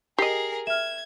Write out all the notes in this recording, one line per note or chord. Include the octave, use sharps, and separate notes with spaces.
G4 G#4 A#4 D#5 C7
E5 F6 G#6 E7